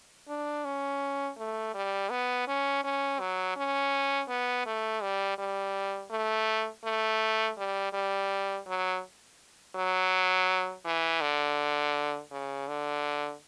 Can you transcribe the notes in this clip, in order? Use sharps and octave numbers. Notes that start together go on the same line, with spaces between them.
D4
C#4
A3
G3
B3
C#4
C#4
F#3
C#4
B3
A3
G3
G3
A3
A3
G3
G3
F#3
F#3
E3
D3
C#3
D3